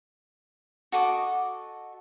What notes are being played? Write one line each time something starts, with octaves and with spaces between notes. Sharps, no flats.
F#4 A4 D#5 D6